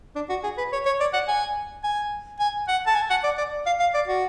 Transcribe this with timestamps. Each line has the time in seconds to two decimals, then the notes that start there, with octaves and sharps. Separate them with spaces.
0.15 D4
0.29 F#4
0.43 G#4
0.58 B4
0.72 C#5
0.86 C#5
1.00 D5
1.13 F#5
1.28 G#5
1.83 G#5
2.40 G#5
2.68 F#5
2.86 A5
2.95 G#5
3.10 F#5
3.24 D5
3.38 D5
3.66 F5
3.80 F5
3.94 D5
4.08 F#4